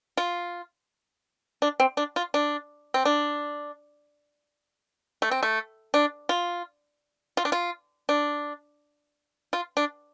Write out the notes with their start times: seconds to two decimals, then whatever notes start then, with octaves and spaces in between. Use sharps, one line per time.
0.17 F4
1.62 D4
1.80 C4
1.97 D4
2.16 F4
2.34 D4
2.94 C4
3.05 D4
5.22 A3
5.31 C4
5.43 A3
5.94 D4
6.29 F4
7.37 F4
7.45 D4
7.52 F4
8.09 D4
9.53 F4
9.77 D4